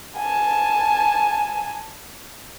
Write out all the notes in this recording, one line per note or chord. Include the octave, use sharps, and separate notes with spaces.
G#5 A5